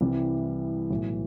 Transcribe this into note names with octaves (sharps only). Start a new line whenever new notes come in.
C2 C3 E3 G3
B1 A2 E3